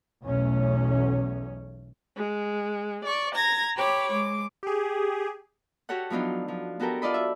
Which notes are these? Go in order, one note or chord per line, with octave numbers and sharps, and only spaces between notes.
B1 E2 A3 C#4
G#3
D5 C#6
A#5 G#6 A#6
G4 C#5 B5 D6
G#3 D6
G4 G#4
F#4 G4 A4 C#5 F#5
F3 F#3 B3 D4 D#4
F3
B3 F#4 G4 A4 A#4
F4 D5 D#5 B5
E5